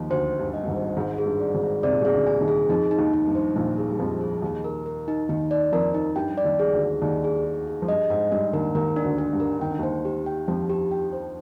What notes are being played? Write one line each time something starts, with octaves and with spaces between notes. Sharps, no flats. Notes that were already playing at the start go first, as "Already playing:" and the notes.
Already playing: D#2 D#3 F3
D2 D3 C5
G5
G2 G3
D#5
G2
G#1 G#2
C5
G#1 G#2 G#4
G#4
G2
D5
G#1 G#2
G#4
C3 D5
A#2
C2 C3
G#4
D2 D3
G#5
D#2 D#3
G#4
F2 F3 D#4
D#4
D#2 D#3
D#4
G2
C5
A#1 A#2 D#4
G#4
G3
F2 F3 D#4
G#4
D#2 D#3 D#4
A#4
A#4
D#4
D#2 D#3 D#4
D5
F2 F3 A#4
D#4
G2 G3 G5
D5
D#2 D#3
G#4
D2 D3
G#4
D#2 D#3 D5
G#4
G#4
G#4
F3
G2 G3 D#5
G#2 G#3 D#5
G2 G3 D4
D#2 D#3 A#4
D#2 D#3 A#4
D4
D2 D3
D4
G2 G3
A#4
D#3 G5
D3
D#2 D#3 C5
G4
G5
F2 F3 G4
G4
G5
C5